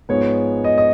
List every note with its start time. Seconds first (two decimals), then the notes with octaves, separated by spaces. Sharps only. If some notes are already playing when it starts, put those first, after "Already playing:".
0.09 G#2 F3 G#3 B3 C#5
0.64 D#5
0.78 D#5